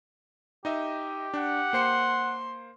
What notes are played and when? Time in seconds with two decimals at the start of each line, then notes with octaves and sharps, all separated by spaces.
0.65 D#4 G4 D#5 E5
1.34 D4 F#5
1.73 A#3 C5 C6 C#7